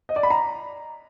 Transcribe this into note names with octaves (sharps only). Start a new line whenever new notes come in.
D#5
D5
B5
A#5